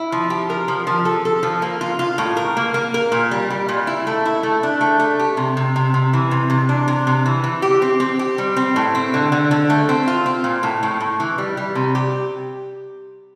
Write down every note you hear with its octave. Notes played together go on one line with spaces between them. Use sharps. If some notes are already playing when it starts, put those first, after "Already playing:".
Already playing: E4
F3
G4
A#4
F3
F3
A4
A4
F3
A#3
F4
F4
A2
A#4
A#3
A#3
A#4
A#2
G3
G3
A#2
E4
A3
E4
A3
D4
A3
A3
G4
C3
C3
C3
C3
E3
C3
C3
D4
C3
C3
E3
E3
G4
C4
C4
G4
G3
C4
A2
C4
D3
D3
D3
A3
C4
F4
C4
A#2
A2
A2
A2
E3
G3
G3
C3
G4